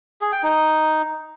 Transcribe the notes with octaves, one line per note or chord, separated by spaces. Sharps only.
G#4
G5
D#4